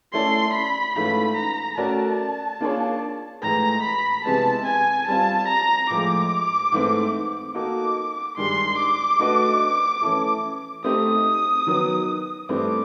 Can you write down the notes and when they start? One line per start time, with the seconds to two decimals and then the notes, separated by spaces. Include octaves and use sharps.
0.13 A3 C#4 E4 A4 D5 C6
0.54 B5
0.95 G#2 E3 A3 C#4 F4 B5
1.37 A#5
1.77 A3 C#4 F#4 A#4 D5 A5
2.61 A#3 D4 F4 G#4 C#5
3.43 A2 E3 G#3 A#5
3.83 B5
4.24 C3 E3 G#3 B3 A5
4.66 G#5
5.07 G3 C4 F4 A5
5.48 A#5
5.90 A2 F3 G#3 D6
6.72 G#2 E3 A3 C4
7.55 A#3 D#4 F#4 A4 D6
8.37 G2 D#3 G#3 C6
8.78 D6
9.19 A3 D4 F#4 B4 D#5
10.02 E3 A3 C#4 E4 A4
10.84 A3 C4 D#4 G4 D#6
11.67 D#3 F#3 B3
12.49 G2 E3 A3 C4 D6